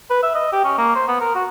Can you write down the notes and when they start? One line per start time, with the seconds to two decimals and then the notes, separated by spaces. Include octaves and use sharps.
0.10 B4
0.23 E5
0.35 D#5
0.53 G4
0.64 C#4
0.78 A#3
0.95 C5
1.08 B3
1.21 A#4
1.35 F#4